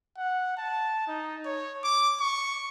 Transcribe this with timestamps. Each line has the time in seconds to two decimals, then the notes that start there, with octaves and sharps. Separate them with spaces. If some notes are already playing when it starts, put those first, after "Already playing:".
0.17 F#5
0.57 A5
1.08 D#4
1.45 C#5
1.84 D6
2.20 C#6